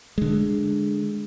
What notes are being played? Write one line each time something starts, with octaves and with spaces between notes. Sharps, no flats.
D3 G#3